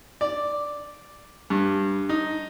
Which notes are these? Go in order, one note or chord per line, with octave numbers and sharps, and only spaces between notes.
D5
G2
D#4